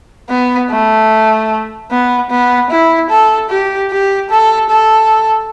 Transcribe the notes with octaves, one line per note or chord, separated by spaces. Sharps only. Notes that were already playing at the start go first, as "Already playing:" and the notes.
B3
A3
B3
B3
E4
A4
G4
G4
A4
A4